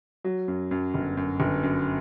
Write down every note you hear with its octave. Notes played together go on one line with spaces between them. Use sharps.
F#3
F#2
F#2
G1
F#2
G1
F#2